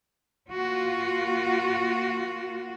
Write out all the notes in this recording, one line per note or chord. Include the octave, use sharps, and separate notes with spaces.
A#3 F4 F#4